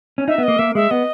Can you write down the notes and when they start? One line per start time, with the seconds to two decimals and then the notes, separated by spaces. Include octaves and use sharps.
0.18 C#4
0.27 D#4 E5
0.38 B3
0.43 A#3 D#5
0.59 A#3 E5
0.75 G#3 E5
0.91 B3 D#5